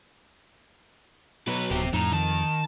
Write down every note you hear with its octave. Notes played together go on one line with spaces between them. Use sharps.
B2 F#3 B4
D1 C4 G4
F2 A2 D#4 A#5
D#3 A5